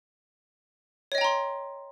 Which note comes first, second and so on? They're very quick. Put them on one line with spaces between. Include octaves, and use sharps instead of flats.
C#5 D#5 G5 A#5 C6